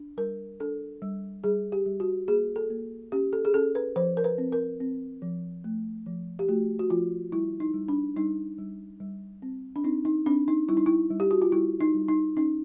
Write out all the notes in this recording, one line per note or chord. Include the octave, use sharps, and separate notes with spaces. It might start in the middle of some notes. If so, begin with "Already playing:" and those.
Already playing: D4
G3 A#4
D4 A4
G3
G3 G#4
G4
G3
F#4
A#3 G#4
A4
A#3
C#4 G4
A4
G#4
C#4 A4
B4
F3 C5
A#4
B4
C4
A#4
C4
F3
A3
F3
G4
A3 F#4
F#4
F3 F4
G3 E4
D#4
G3
D4
G3 D#4
G3
G3
C4
D4
C4 D#4
D#4
C4 D4
D#4
G3 E4
D#4
E4
G3
G4
F#4
F4
G3 E4
D#4
G3
D#4
C#4 D#4